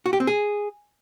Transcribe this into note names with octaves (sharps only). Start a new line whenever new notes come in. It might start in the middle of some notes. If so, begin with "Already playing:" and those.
F#4
G4
C4
G#4